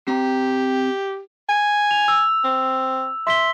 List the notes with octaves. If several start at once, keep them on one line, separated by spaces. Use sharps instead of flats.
C4 G4 A#5
G#5
F7
E6
C4
E5 C6 B6 G7